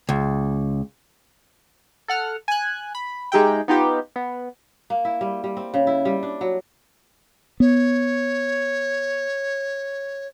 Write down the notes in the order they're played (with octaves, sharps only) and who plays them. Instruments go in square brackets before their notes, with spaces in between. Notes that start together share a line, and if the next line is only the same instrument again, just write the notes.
[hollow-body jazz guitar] C#2
[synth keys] A4 F#5 F6
G#5 F#6
B5
G#3 D#4 G4 E5 G5
B3 D#4 F4 G4
B3
[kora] A#3
E4
G3
G3
C4
C#3
E4
G3
D4
F#3
[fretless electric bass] B3 [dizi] C#5